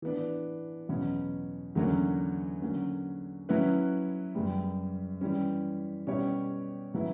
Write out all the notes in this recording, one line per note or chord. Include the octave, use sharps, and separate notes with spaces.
E3 B3 D4
E2 B2 F#3 C#4
E2 D3 F#3 A#3 C#4
D3 F#3 A#3 C#4
F#3 C#4 E4 B4
F#2 C#3 G3 B3
E3 G3 C#4
B2 G3 C#4 G4 C#5
C#3 F#3 B3 E4